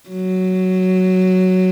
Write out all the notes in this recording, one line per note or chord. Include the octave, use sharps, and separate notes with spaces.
F#3